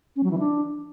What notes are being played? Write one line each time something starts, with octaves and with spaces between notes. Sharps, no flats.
C#4
F#3
E3
D4